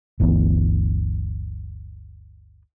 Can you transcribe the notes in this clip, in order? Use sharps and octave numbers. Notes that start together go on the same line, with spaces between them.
G1 D2 E3 B3